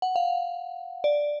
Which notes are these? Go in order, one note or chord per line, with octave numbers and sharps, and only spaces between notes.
F#5
F5
D5